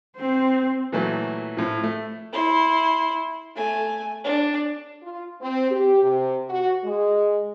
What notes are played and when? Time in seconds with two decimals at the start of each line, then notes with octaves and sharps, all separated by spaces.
0.17 C4 C5
0.92 A#2 E3 F#3 A3
1.57 A2 F3
1.83 A3
2.33 E4 C6
3.55 A3 G#5
4.24 D4
5.01 F4
5.41 C4
5.70 G4
6.02 C3
6.49 F#4
6.83 G#3